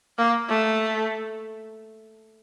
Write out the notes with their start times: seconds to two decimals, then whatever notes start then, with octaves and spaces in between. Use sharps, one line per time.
0.18 A#3
0.49 A3